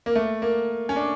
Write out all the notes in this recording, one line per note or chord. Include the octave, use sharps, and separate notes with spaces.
A#3
A3
A#3
C#4
D4